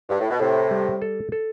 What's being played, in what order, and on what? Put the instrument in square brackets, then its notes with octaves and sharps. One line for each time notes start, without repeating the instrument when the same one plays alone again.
[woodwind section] G2
A2
B2
[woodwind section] A2 C3 [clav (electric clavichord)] A4
[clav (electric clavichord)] G3
A4
A4